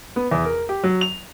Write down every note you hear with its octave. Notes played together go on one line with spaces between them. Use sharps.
B3
E2
A#4
G4
F#3
F7